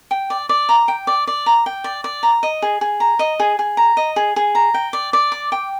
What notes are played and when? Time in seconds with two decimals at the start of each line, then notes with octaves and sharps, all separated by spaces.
0.11 G5
0.30 D5
0.49 D5
0.69 A#5
0.88 G5
1.07 D5
1.27 D5
1.46 A#5
1.66 G5
1.84 D5
2.04 D5
2.23 A#5
2.43 D#5
2.62 G#4
2.81 G#4
3.00 A#5
3.19 D#5
3.40 G#4
3.59 G#4
3.77 A#5
3.97 D#5
4.16 G#4
4.36 G#4
4.55 A#5
4.74 G5
4.93 D5
5.13 D5
5.32 D6
5.52 G5